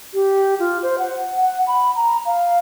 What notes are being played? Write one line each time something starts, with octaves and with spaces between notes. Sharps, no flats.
G4
F4
C5
F#5
F#5
B5
A#5
F5